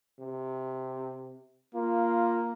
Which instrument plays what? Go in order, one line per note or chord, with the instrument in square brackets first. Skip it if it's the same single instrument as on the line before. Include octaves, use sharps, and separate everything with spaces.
[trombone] C3
[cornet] A#3 [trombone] F4